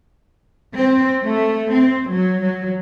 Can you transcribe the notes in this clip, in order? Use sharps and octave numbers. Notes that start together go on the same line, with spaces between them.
C4
A3
C4
F#3
F#3